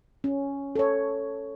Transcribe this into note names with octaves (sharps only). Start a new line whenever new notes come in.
C#4
A4 C#5